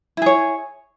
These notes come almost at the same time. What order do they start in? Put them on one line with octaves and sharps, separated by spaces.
E4 G#4 C#5